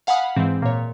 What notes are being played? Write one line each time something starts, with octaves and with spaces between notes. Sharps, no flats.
F5 F#5 G#5 B5 D#6
G#2 E3 G#3 C4
A#2 C#5